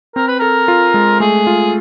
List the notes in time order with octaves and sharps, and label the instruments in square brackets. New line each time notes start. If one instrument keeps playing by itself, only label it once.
[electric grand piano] C4 [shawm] A#4
[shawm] B4
[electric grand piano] A4 [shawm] A#4
[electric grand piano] F4
G#3
[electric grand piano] A3 [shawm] G#4
[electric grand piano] F4